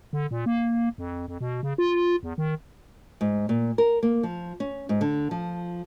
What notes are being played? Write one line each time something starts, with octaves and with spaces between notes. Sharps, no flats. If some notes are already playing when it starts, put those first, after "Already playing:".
D3
A#2
A#3
F2
F2
B2
C#3
F4
E2
D#3
G#2
A#2
A#4
A#3
F3
C#4
G#2
D3
F3